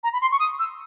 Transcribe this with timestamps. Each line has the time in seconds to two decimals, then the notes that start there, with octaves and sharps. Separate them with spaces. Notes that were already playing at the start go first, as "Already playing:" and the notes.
0.04 A#5
0.13 B5
0.21 C6
0.32 C#6
0.40 D#6
0.59 E6